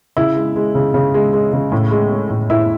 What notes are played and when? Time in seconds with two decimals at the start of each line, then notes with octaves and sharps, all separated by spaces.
0.17 C#3 E4 E5
0.36 G#3
0.56 G#3
0.75 C#3
0.94 C#3
1.14 G#3
1.33 G#3
1.53 C#3
1.72 A2
1.91 G#3
2.11 G#3
2.30 A2
2.50 A2 E4 E5